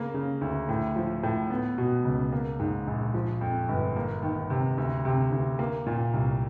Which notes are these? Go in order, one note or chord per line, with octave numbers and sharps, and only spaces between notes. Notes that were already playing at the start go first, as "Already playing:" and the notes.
Already playing: C#3 A#3
C#3
D2
A2
F3
A2
B3
B2
C#2
A#3
G#2
A#1
F3
F2
G1
A#3
D#3
C3
D2
C3
D2
A#3
A#2
C2